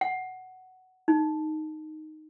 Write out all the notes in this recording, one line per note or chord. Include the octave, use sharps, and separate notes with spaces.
F#5
D#4